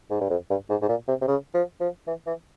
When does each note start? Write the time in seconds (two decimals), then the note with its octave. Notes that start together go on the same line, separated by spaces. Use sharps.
0.11 G#2
0.21 G2
0.30 F2
0.50 G2
0.70 G#2
0.82 G#2
0.89 A#2
1.08 C3
1.22 C3
1.28 C#3
1.54 F3
1.80 F3
2.07 E3
2.27 E3